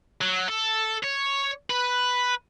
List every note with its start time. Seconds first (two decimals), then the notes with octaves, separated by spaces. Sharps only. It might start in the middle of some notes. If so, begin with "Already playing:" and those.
0.21 F#3
0.49 A4
1.03 C#5
1.70 B4